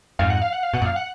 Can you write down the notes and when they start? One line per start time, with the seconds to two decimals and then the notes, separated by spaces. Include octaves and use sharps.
0.19 F2 G#2 F5
0.30 F#5
0.41 F5
0.53 F#5
0.63 F5
0.73 B2 F#5
0.82 F#2 A#2
0.86 F5
0.96 F#5